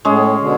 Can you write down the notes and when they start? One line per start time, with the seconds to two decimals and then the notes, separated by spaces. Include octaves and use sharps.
0.04 A2 G#3 C#4 G#4
0.40 B2 D3